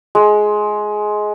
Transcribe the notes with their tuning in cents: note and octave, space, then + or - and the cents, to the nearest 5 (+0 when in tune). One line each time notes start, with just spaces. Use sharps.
G#3 +15